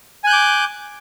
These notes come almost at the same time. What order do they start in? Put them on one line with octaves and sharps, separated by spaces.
G#5 F#6 G6 D6